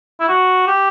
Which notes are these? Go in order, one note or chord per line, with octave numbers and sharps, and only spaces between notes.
E4
F#4
G4